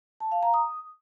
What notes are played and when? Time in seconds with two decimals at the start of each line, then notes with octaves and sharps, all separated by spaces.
0.20 A5
0.32 F5
0.43 A#5
0.54 D#6